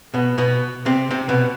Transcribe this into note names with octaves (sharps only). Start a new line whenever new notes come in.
B2 B3
B2 B3
C3 C4
C3 C4
B2 B3